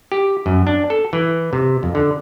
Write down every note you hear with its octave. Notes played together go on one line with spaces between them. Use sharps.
G4
F#2
D4
A4
E3
C3
F2
D3